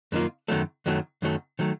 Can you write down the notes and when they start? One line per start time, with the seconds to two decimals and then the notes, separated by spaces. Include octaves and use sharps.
0.12 F#2 D#3 A#3 F4
0.48 F#2 D#3 F#3 A3
0.86 F#2 D#3 F#3 A3
1.22 F#2 D#3 F#3 A3
1.59 D#3 F#3 A3